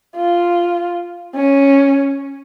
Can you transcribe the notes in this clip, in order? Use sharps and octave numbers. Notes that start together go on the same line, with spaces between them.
F4
C#4